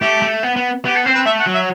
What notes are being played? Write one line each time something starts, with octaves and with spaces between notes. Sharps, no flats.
A3 G4
A3
B3
B3
B3 G4
A4
C4 C5
B4
A3 E5
F#5
F#3
E5